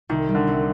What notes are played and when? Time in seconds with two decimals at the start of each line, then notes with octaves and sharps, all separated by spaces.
0.09 C2 D#3
0.29 G3
0.35 D3
0.47 C2